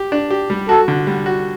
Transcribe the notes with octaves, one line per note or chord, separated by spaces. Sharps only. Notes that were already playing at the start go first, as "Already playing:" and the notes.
Already playing: G4
D4
G4
G3
F#4 A4
D3
G3
F#4